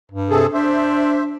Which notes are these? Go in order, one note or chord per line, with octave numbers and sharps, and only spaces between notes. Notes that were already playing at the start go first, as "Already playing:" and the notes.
G2
C3 G#4 A4
D4 C5 E5